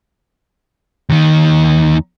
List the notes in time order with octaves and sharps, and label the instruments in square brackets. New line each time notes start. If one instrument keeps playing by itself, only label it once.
[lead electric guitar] D#2 D#3